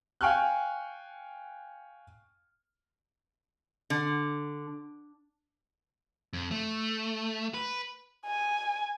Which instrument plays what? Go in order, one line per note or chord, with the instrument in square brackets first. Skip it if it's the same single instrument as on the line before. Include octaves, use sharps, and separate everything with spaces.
[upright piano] F5 G5 G#5 C#6 F6 F#6
[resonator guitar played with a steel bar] D3
[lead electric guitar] F2
A3
B4
[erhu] G#5